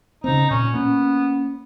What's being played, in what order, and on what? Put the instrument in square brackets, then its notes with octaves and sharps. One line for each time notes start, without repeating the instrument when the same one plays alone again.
[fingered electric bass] C#3 C4 [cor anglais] D#4
[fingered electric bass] A#2 [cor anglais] C#4
[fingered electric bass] A#3 C#4 [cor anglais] B3